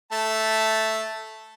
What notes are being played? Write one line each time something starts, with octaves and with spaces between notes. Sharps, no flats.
A3 A5